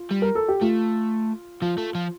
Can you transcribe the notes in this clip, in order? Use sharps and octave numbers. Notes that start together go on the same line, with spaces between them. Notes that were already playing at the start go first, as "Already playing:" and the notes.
Already playing: F4
G3
A#4
A4
G4
A3 F4
F3 F4
A3
F3